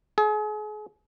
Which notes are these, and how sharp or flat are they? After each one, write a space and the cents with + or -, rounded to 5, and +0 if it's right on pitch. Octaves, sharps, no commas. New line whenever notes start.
G#4 +35